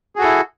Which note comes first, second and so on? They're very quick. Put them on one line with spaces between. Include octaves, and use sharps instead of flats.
G#4 F#4 A4 E4